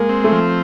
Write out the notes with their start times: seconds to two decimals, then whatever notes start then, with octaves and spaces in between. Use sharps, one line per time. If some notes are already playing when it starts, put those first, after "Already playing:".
Already playing: G#3 A#3
0.09 C4
0.24 A3
0.32 F3